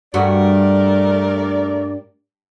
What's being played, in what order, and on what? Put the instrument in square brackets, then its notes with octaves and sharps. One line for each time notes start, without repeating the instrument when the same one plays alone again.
[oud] G2 F#4 [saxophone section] A3 A#4 D5